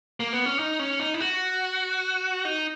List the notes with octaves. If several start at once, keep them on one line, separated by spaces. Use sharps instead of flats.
A#3
B3
C#4
D#4
C#4
D#4
E4
F#4
D#4